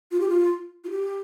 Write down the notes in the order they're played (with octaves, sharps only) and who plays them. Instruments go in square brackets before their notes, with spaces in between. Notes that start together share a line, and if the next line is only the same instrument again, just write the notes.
[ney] F4
G4
F4
F4
G4